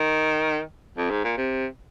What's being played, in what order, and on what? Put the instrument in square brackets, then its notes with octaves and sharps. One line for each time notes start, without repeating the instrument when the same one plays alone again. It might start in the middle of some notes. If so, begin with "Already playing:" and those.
Already playing: [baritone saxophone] D#3
F2
G#2
A#2
C3